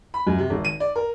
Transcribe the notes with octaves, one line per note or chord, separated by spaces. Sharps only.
B5
F#2
C3
G#1
D#7
D5
A#4